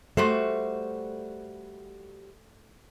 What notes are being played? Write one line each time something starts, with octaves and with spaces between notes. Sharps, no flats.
G3 A3 F#4 C5